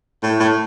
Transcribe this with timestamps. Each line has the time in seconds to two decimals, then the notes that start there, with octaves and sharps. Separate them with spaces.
0.23 A2
0.40 A2